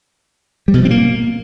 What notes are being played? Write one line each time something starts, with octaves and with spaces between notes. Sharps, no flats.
G3
B2
F3
C4
A#3